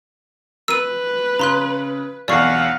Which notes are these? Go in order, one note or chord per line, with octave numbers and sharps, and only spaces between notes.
B4 E6 D#7
C#3 A#5 C6 F#6
B1 E2 D5 F5 F#5 C#6